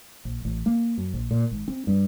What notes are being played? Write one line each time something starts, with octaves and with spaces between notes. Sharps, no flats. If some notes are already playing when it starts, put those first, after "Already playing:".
A#1
A1
A#3
F#2
A#1
A#2
G#1
C4
G2